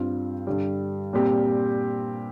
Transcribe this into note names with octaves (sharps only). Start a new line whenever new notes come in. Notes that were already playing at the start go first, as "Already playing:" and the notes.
Already playing: G2 G3 C4 F4
G2 D3 G3
A#2 G3 C4 G4